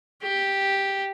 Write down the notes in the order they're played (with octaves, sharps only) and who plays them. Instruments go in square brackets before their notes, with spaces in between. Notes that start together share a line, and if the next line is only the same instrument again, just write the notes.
[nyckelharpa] G4